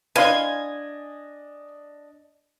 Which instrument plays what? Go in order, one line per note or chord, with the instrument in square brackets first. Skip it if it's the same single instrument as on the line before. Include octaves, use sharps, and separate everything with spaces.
[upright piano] D4 D#5 [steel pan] B4 F5 C6 [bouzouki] G#5